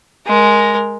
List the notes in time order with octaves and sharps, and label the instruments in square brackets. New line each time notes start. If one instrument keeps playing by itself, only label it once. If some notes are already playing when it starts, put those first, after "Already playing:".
[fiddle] G#3 A#4